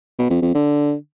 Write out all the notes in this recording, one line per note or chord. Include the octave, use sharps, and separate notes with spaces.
B2
F2
F2
D3